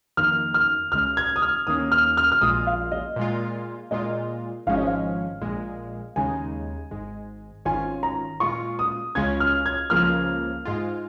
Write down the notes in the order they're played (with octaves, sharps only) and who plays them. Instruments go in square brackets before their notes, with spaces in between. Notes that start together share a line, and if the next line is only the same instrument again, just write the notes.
[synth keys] F2 D#3 A#3 D#4 [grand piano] F6
[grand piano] F6
[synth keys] C#2 C#3 G#3 [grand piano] F6
[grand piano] G#6
D#6
F6
[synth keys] D#2 D#3 A#3 C#4 [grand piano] D#6
[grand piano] F6
F6
F6
[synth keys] A#1 A#2 G#3 F4 [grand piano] D#6
[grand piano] F5
D#5
[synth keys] A#2 G#3 F4
[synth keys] A#2 G#3 F4 [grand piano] D#5
[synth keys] G#1 G#2 F3 G#3 C#4 [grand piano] F5
[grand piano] D#5
F5
[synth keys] A#1 A#2 G#3
[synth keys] D#2 C#3 G#3 D#4 [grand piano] G#5
[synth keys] G#1 G#2 G#3
[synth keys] G#1 G#2 D#3 C#4 F4 [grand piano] G#5
[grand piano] A#5
[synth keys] A#2 G#3 F4 [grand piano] C#6
[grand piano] D#6
[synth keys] C#2 C#3 G#3 C#4 F4 [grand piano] G#6
[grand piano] F6
G#6
[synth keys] C#2 C#3 F3 A#3 F4 [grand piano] F6
[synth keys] G#2 G#3 F4